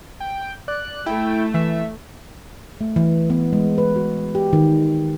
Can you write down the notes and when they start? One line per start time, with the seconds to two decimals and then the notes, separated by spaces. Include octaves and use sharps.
0.20 G5
0.68 D5 F#6
1.06 A3 E4 G5
1.54 E3 E5
2.81 A3
2.96 E3
3.30 B3
3.53 G#3
3.78 B4
3.96 F#4
4.35 G4
4.53 D#3